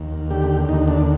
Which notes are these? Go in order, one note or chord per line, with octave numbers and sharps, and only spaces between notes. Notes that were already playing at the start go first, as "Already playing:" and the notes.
Already playing: D#2
D3 G4
D#2 D#4
D4